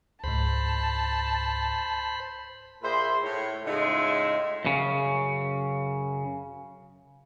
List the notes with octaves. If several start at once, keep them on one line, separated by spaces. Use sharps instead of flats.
C#2 G#2 C5 A5 B5
A#2 G#4 C5 E5 B5 C6
A2 C#5
A2 C#3 G#3 D#4 F4 E5
F#2 C#3